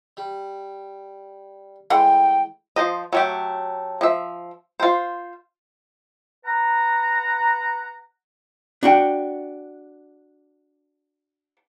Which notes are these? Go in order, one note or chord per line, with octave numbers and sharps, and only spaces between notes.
G3
A2 E3 G#3 F#5 G5
F3 C5 D#5
F#3 A3 G4
F3 E5
F4 C5
B4 F#5 A#5
D4 F#4 G5